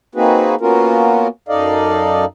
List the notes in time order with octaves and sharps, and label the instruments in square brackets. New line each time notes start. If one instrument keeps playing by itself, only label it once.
[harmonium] A#3 C4 D#4 F#4 G#4 B4
A#3 B3 C#4 F4 F#4 A#4
F#2 D#4 A4 D5 D#5 F5